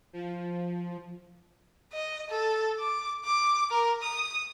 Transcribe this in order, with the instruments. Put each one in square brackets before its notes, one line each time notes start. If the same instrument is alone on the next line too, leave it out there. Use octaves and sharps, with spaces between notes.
[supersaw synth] F3
[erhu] D#5
A4
D6
D6
A#4
D#6